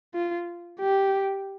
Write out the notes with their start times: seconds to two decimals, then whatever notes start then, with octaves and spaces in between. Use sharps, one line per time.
0.15 F4
0.80 G4